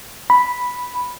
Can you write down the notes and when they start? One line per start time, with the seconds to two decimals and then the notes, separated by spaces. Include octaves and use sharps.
0.30 B5